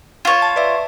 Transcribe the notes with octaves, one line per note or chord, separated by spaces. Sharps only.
F4 C#5 E7
A5
B4 D5 E5